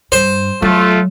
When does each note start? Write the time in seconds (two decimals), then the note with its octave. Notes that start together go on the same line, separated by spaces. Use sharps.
0.12 G2 C5
0.62 F#3 A3 F4